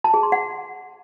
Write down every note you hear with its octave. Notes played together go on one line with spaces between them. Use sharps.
A5
G#4
C6
F#5